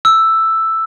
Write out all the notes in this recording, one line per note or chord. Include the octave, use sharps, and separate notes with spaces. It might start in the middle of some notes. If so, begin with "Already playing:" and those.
E6